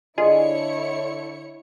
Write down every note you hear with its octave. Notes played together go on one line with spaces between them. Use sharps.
D3 E4 F4 G#4 C#5 D#5 C#7